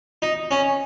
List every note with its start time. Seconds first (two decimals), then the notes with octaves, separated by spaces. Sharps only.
0.22 D#4
0.51 C#4